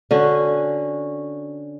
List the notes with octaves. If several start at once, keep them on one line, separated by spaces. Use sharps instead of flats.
D3 C#4 F#4